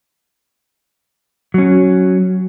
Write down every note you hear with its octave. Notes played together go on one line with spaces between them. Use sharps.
F#3 C#4